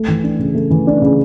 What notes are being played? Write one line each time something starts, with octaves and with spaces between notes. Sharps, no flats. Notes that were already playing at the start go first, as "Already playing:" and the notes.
Already playing: A3
E3
D4
C#3
A3
E3
D4
C#3